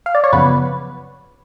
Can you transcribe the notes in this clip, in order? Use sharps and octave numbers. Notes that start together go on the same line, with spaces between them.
F5
D5
C#5
F#2 C#3 F3 B3 B4